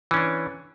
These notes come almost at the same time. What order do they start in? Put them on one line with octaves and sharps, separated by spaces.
E3 C#4 D4